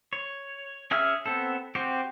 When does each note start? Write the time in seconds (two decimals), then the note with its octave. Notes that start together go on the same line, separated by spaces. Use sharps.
0.13 C#5
0.91 C#4 G#4 E5 E6 F6
1.26 B3 C4 A4
1.75 C4 F#4 G4